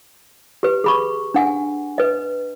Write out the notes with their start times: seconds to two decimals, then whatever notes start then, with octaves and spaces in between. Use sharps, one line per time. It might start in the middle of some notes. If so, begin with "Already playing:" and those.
0.63 G4 B4
0.84 G#4 B5 C#6
1.34 D4 F#5 G#5
1.98 B4 D#5